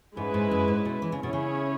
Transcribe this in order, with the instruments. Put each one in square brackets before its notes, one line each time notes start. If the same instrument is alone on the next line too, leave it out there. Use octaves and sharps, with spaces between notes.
[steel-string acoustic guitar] G#2 [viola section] G#3 C#4 E4 B4
[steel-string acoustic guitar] G#2
F#2
G#2
B2
E3
C#3
[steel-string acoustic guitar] B2 [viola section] C#4 E4 G#4 C#5
[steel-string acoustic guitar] C#3